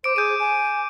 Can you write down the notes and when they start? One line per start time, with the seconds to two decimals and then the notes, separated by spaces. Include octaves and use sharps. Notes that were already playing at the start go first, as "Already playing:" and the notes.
0.04 C5 D6 D7
0.16 G#4 G6 D#7
0.40 G#5